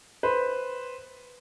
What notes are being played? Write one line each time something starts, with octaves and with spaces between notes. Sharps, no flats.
B4 C5